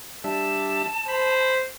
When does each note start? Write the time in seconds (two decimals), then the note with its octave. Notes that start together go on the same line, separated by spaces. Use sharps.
0.24 G3 D4 E5 A5
1.08 C5 B5